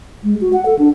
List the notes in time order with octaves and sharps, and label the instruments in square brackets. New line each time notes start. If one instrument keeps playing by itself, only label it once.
[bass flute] G#3
F#4
F#5
A4
D4